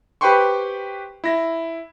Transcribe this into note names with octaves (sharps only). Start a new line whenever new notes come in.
G4 B4 C5 G5 C6 C#6
E4 A#6